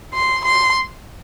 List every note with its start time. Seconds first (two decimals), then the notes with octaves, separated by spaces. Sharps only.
0.14 C6
0.45 C6